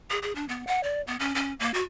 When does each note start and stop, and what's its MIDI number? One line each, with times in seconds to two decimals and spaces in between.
0.10 0.19 68
0.22 0.34 68
0.35 0.47 62
0.49 0.66 59
0.67 0.83 78
0.83 1.02 74
1.07 1.16 59
1.20 1.33 61
1.35 1.53 61
1.60 1.72 58
1.74 1.82 66